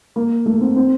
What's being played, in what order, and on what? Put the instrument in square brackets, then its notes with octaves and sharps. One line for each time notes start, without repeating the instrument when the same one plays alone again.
[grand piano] A#3
A3
C4
C4